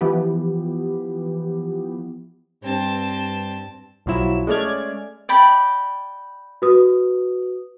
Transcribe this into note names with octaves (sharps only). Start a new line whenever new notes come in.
E3 F3 B3 G4
G2 C4 A5
B1 F3 F#3 E4 E7
G#3 A3 C#4 D5 F6 G#6
D5 G5 B5
F#4 B4 D#6